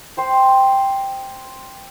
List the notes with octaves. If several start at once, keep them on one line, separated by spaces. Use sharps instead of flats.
C5 G5 C6